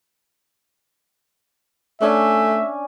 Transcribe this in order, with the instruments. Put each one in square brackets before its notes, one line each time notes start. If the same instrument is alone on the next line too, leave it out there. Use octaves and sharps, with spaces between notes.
[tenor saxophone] A3 [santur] C#4 D4 G#5 [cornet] E5